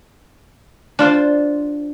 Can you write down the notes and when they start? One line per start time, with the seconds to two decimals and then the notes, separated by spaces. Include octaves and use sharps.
0.99 D4 F4 C5